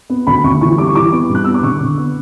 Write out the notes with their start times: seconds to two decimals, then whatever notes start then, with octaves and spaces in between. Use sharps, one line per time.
0.10 B3
0.27 D2 B5
0.44 D2 C#6
0.61 E3 C#6
0.78 G3 D6
0.87 C#6
0.95 E3 D6
1.12 B3
1.29 G2
1.35 F#6
1.44 B3 E6
1.54 D6
1.63 D3 C#6
1.81 D3
1.98 B3